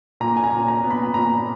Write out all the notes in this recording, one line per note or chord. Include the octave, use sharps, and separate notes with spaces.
A#2 A#5
G#5
A#5
A#2
A#5
B3
B5
A#2 A#5